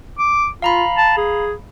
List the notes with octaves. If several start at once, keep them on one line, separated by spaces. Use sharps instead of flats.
D6
F4 F5 A#5 B5
A5
G#4